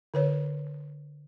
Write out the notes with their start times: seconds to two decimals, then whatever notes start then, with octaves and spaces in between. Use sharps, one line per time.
0.14 D3 B4 C#5